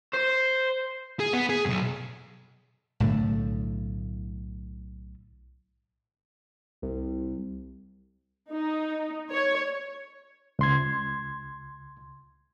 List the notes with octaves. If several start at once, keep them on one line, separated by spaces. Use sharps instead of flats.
C5
G#4
B3
G#4
B1 F#2
B1 A2 D3 A3
C2
D#4
C#5
C#2 C6 G#6